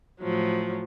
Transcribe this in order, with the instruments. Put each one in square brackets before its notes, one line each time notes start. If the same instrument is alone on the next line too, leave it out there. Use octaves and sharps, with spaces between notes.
[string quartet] A2 F3 F#3